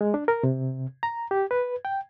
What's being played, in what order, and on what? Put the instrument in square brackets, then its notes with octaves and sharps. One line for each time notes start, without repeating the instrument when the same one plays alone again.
[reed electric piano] G#3
D4
A#4
C3
A#5
G4
B4
G5